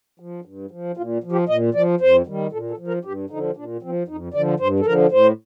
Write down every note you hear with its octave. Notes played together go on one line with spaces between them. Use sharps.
F3
G2
F3
A#2 F4
F3
G4
A#2 D#5
F3 D5
F2 C5
D#3 G3
A#2 A4
A4
F3
A#4
G2 G4
D3 F3 D#4
A#2 D4
F3 C4
F2 D#4
D3 F3 D5
G2 C5
A4
D3 F3 A#4
A2 C5